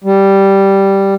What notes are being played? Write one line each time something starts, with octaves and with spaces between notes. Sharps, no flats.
G3